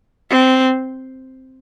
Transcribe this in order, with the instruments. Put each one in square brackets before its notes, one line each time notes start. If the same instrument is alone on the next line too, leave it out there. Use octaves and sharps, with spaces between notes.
[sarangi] C4